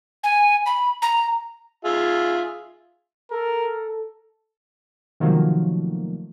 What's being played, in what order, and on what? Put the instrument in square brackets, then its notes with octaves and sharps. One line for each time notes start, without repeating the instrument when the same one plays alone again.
[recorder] G#5
B5
A#5
[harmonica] F4 G#4 E5
[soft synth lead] A4 [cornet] A#4
[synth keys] C3 D#3 F3 F#3 A3 A#3